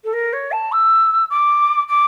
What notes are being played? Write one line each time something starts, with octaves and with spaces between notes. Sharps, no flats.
A4
A#4
C#5
A5
E6
D6
D6